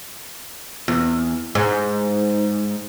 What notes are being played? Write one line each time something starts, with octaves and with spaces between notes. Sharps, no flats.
E2
G#2